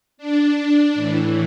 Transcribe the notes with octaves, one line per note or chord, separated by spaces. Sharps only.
D4
A2 E3